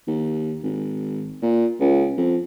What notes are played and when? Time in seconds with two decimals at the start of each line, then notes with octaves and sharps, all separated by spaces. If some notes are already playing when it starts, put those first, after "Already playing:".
0.08 D#2
0.63 G#1
1.42 A#2
1.80 C#2
2.17 F2